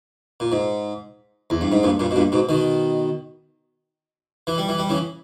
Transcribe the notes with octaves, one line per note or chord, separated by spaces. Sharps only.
A#2
G#2
E2
G2
G#2
G2 A#2
G2 A#2
B2
G2 A#2
G#2 B2
B2 D#3
E3
G3
E3
G3
C#3 E3